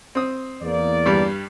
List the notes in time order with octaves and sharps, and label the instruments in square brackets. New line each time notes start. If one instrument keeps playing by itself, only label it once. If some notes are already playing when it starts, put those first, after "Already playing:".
[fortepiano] C4 D#6
[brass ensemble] E2 A#3 D5
[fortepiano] G2 G3